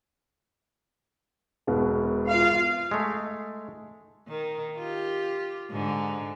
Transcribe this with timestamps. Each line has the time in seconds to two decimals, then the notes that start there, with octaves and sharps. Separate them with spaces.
1.67 E1 B2 B3
2.29 F4 F5
2.91 G#3 A3
4.28 D#3
4.77 F4 G4
5.70 G#2 D3